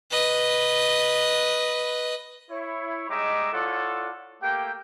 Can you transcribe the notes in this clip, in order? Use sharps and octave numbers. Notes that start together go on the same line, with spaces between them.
B4 D#5
E4 C#5
G3 G#3 D#4 D#5 E5 D6
E4 F4 A4 C#5 D5 F#5
A3 A#3 G4 G5